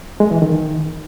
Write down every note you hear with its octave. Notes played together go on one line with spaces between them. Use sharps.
G#3
E3
D#3